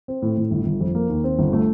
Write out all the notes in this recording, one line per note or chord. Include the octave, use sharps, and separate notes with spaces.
C4
A2
A2
G1
G1
F2
A#3
D#2
C4
G1
A3